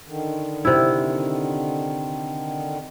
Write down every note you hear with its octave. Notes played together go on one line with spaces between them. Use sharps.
D3 D#3
C3 E4